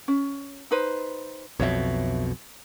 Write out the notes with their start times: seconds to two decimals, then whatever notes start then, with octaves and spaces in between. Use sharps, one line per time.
0.08 C#4
0.71 D#4 B4 C5
1.60 B1 F2 B2 C#5 E5